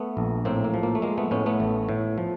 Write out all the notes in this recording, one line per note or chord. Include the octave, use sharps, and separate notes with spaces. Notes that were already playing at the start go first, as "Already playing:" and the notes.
Already playing: A3 B3
A#1
A2 A#3 C4
A#3
F3
A#3
A3
G#3 A#3
A3 B3
A2 B3 C#4
A3 B3
A1
A2
F3